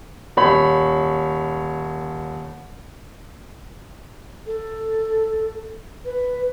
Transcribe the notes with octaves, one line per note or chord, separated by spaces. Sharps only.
D#1 C#5 B5
A4
B4